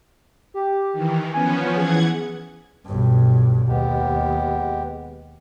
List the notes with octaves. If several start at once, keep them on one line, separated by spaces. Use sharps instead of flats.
G4
D#3 E3
F3 B3 C#4 G#5
E3 G#4 F#5 G#6
B1 G2
D#2 G#3 B3 G4